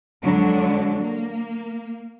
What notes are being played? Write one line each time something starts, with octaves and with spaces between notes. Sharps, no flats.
F2 D3 F#3 G#3 D4
A#3